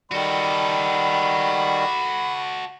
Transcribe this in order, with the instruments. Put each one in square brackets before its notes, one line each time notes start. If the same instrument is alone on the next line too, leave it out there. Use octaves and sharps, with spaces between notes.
[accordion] D#3 G3 [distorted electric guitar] F#4 A4 [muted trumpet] B5